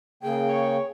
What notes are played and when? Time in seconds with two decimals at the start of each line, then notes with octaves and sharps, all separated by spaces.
0.23 C#3 A#3 G#4 G5
0.49 C#5